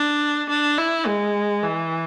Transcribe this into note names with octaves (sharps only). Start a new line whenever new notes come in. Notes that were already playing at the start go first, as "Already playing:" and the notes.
Already playing: D4
D4
E4
G#3
E3